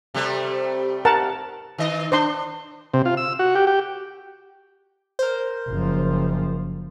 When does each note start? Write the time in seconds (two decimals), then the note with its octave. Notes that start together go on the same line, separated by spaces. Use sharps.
0.14 C3 G3 A3
1.05 A#4 F#5 A5
1.78 D#3 D#5
2.12 D4 C5 C6
2.94 C3
3.05 F4
3.17 E6
3.39 F#4
3.55 G4
3.67 G4
5.19 A#4 C5
5.68 F#1 F3